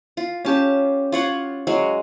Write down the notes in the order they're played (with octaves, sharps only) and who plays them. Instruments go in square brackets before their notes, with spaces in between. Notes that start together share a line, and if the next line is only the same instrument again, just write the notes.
[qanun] F4
[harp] C#4 G4 [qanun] F4 A5
[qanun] F4 C#5 F#5
F#3 G#3 F5